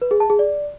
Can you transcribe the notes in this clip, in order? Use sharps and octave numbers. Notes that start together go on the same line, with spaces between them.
B4
G#4
A5
G#4
D5